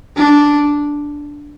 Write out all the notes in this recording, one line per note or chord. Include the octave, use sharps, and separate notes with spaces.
D4